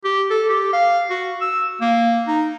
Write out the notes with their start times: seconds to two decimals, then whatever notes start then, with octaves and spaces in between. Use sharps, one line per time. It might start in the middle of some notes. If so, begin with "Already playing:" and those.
0.04 G4
0.30 A4
0.49 G4
0.73 F5
1.10 F#4
1.41 E6
1.81 A#3
2.27 D#4